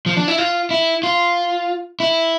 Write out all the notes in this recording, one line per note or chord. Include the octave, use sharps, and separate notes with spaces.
F3
D4
E4
F4
E4
F4
E4